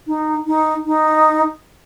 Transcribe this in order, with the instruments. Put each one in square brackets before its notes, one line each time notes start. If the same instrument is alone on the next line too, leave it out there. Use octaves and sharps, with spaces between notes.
[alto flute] D#4
D#4
D#4